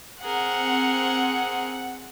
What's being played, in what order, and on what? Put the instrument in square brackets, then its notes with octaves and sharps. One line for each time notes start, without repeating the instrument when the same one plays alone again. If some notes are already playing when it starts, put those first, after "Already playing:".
[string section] C4 F#5 [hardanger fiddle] G#4 A#4